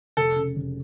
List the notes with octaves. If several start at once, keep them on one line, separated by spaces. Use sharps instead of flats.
F1 A4
C#3
F1